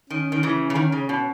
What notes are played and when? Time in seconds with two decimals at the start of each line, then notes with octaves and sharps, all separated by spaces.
0.10 D#3 C#4
0.32 D#3
0.43 C#3 E3
0.70 C#3
0.75 D#3
0.92 C#3
1.09 B2